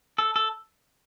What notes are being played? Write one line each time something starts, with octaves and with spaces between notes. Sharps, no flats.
A4
A4